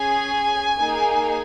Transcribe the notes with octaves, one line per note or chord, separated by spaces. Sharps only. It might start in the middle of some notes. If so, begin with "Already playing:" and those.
Already playing: C#4 G#4 G#5
A#3 D#4 G#4